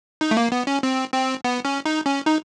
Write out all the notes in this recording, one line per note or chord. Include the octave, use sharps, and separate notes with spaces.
D#4
A3
A#3
B3
C#4
C4
C4
B3
C#4
D#4
C#4
D#4